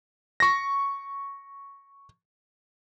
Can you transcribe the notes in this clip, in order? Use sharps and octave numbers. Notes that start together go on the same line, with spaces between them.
C#6 A#6